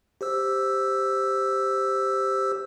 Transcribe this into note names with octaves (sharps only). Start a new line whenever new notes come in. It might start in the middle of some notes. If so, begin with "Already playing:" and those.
G4 C5 E6